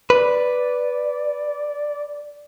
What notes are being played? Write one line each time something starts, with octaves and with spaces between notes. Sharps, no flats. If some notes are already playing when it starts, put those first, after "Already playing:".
B4 D5